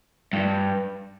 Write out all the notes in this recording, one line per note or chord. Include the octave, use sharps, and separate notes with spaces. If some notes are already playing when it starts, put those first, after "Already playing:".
G2